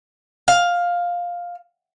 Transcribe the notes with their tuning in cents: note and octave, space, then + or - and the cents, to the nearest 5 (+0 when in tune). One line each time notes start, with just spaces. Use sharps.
F5 +10